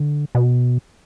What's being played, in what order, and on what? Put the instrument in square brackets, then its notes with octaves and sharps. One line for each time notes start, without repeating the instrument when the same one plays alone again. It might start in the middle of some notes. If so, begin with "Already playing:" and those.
Already playing: [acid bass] D3
B2